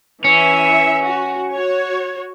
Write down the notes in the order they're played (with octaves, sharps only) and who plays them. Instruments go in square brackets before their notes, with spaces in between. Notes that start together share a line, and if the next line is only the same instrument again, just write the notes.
[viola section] E3 E5 [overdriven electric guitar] C#4
[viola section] F#4
F#4 C#5